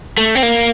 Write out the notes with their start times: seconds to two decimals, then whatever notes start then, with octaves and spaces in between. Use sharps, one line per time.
0.18 A3
0.35 C4
0.43 A#3